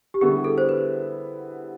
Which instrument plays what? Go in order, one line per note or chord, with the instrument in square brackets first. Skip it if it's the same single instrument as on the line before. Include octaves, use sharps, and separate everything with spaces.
[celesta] G4
[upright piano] D3 G3 B3 E4 [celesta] G#4
[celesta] A4
C5
B4